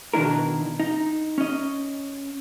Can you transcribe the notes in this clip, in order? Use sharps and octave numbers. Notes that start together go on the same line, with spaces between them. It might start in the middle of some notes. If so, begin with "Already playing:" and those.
B2 D#3 D4 E4 A#4
D#4
C#4 D#5